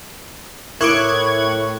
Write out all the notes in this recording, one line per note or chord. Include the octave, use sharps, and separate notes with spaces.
A2 E4 A#4 C#6 D6 F#6 G#6 D7